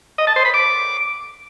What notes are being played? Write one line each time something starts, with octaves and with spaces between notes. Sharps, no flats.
D#5
A5
C5
B5
D6